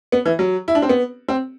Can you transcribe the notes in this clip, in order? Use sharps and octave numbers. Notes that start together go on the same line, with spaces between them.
B3
E3
F#3
E4
D4
C4
B3
C4